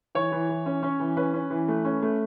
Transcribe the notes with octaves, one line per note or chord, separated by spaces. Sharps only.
E3 C#5
E3
E3
C#4
C#4
E3
C#4 B4
C#4
E3
A3
C#4
A3